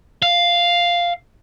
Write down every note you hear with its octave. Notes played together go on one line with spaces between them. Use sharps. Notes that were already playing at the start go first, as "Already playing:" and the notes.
F5